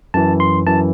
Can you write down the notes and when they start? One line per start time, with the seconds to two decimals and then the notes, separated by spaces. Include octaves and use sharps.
0.14 F#2 E3 A5
0.40 C6
0.66 F#2 E3 A5